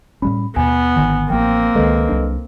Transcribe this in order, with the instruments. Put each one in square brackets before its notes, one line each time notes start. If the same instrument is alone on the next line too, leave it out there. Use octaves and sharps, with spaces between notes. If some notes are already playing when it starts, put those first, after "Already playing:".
[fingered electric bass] A2 G3 C#4 [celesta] B5
[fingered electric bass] D#2 B2 [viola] B3 [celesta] G#5
[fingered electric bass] G#1 D3 D#3 [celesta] G#5
[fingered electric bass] A1 F3 [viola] A#3 C4 [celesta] G5
[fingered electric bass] C#2 D#3 G#3 [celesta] A4 B4 D#5
[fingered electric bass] C2 F#3 D4